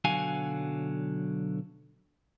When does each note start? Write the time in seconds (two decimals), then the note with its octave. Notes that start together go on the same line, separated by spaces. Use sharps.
0.04 B1 D3 F#3 F#4 F5 G#5